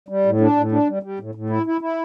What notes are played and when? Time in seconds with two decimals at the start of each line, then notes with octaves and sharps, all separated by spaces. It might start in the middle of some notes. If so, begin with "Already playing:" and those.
0.09 G3
0.25 A2
0.40 D4
0.56 A2
0.72 D4
0.87 G3
1.03 G3
1.19 A2
1.35 A2
1.50 E4
1.66 E4
1.81 E4